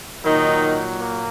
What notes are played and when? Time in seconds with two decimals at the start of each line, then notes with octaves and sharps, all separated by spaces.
0.24 A#2 D#3 F#3 D#4
0.98 A#3